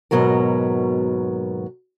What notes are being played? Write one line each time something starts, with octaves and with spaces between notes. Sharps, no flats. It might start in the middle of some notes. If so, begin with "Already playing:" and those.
D#2 G#2 B2 F#3 B3 A#4